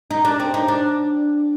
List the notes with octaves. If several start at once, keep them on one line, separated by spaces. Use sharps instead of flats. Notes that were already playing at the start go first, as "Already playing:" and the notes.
D#4
D4
C4
D#4
D4